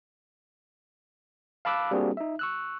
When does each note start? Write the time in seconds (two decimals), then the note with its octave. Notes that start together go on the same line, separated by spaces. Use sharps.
1.65 F5 A5 B5 D6 E6 F#6
1.91 G3 A#3 C4 D4 F#4 G#4
2.17 D#4 E5
2.39 C#6 E6 F#6